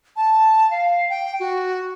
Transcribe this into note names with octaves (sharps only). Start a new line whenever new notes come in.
A5
F5
G5
F#4